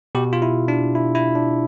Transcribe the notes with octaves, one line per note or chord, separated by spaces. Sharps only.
B2 G4
F4
E4
D4
E4
E4
D4